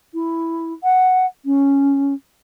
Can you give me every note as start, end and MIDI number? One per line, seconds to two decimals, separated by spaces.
0.14 0.73 64
0.84 1.26 78
1.45 2.14 61